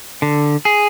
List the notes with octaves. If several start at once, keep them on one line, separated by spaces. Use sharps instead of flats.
D3
G#4